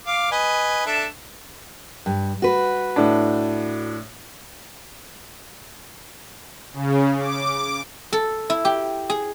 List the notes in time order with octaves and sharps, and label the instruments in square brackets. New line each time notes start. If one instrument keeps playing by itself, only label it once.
[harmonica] F5 D6
B4 D#5 G#5
D4 A4 E5
[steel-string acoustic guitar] G2
F#4 B4
[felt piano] A2 D4
[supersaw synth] C#3
D6
[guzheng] A4
E4
G4
G#4